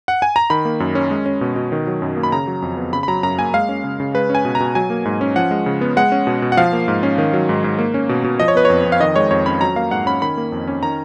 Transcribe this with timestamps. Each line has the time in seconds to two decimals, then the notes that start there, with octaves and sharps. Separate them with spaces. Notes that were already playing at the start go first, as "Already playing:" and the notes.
0.08 F#5
0.22 G#5
0.36 A#5
0.50 D#3 B5
0.65 A#3
0.80 F#2
0.95 C#4
1.11 G#3
1.26 C#4
1.41 B2
1.56 B2
1.72 D#3
1.87 F#3
2.02 F#2
2.17 A#3
2.23 B5
2.32 C#3 A#5
2.47 F#3
2.62 F2
2.77 B3
2.93 C#3 B5
3.03 B5
3.08 F#3 A#5
3.23 F#2 A#5
3.38 A#3 G#5
3.54 G#3 F5
3.69 C#4
3.84 C#3
4.00 C#3
4.14 G#3 B4
4.30 C#4 G#5
4.45 B2
4.55 A#5
4.60 B2
4.75 F#3 G#5
4.90 A#3
5.05 G#2
5.21 C#4
5.36 F3 F#5
5.51 G#3
5.66 C#3
5.81 B3
5.97 G#3 F#5
6.12 C#4
6.27 B2
6.42 B2
6.52 F#5
6.57 F3 F5
6.73 A#3
6.88 G#2
7.03 C#4
7.18 D#3
7.33 F#3
7.49 G#2
7.64 G#2
7.79 A#3
7.94 C#4
8.09 B2
8.24 B2
8.40 F3 D#5
8.48 C#5
8.55 B3 B4
8.65 F2 C#5
8.85 F2
8.92 F5
9.00 D#3 D#5
9.16 G#3 C#5
9.31 F2 C#5
9.46 C#4 B5
9.61 F#3 A#5
9.76 A#3 F5
9.91 G#2 F#5
10.06 C#4 B5
10.21 D#3 B5
10.37 A#3
10.52 F2
10.67 C#4
10.82 D#3 A#5